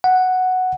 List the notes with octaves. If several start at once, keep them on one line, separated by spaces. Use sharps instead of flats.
F#5